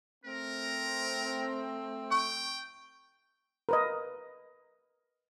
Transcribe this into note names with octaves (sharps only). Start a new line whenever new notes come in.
A3 C4 A#4
G5 C#6
A#4 B4 D#5